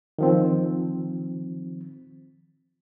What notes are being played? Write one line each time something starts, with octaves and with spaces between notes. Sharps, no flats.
D#3 F3 C4